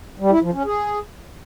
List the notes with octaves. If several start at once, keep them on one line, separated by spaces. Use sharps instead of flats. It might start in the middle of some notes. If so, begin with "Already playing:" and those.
G3
E4
F3
C#4
G#4